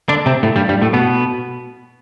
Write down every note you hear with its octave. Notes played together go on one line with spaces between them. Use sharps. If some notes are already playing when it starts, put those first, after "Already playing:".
D3 D4
C3 C4
A2 A3
G2 G3
G2 G3
A2 A3
B2 B3